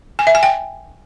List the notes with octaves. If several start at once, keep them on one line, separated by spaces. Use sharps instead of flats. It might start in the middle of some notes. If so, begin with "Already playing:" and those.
G#5
E5
G#5
G5